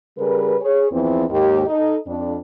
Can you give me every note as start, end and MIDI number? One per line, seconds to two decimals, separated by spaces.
0.18 0.55 49
0.18 0.55 55
0.18 0.55 68
0.18 0.55 70
0.18 0.55 71
0.61 0.87 68
0.61 0.87 73
0.91 1.24 40
0.91 1.24 52
0.91 1.24 53
0.91 1.24 60
1.30 1.62 39
1.30 1.62 44
1.30 1.62 67
1.66 1.97 63
1.66 1.97 69
1.66 1.97 75
2.07 2.36 41
2.07 2.36 62